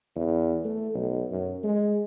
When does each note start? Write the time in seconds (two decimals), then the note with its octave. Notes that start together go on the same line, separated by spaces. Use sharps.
0.16 E2
0.64 A3
0.94 B1
1.30 F#2
1.64 G#3